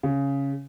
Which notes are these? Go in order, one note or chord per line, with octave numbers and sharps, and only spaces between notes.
C#3